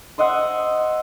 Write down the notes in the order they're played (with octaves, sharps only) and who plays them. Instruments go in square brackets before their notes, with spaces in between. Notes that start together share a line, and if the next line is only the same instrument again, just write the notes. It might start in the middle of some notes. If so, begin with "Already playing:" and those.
[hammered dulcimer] C5 D#5 E5 F#5